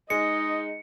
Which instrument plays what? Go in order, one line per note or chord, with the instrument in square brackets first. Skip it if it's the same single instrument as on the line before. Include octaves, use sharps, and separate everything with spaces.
[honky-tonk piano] G#3 [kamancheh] D#4 [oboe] D#5 [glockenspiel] C#7